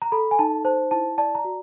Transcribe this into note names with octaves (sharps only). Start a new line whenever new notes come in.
A#5
A4 B5
G#5
D#4 A5
C5 A5
E4 A5
D5 A5
A#5
F#4